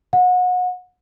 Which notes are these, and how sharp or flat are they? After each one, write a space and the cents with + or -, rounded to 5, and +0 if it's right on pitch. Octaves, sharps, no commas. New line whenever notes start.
F#5 -30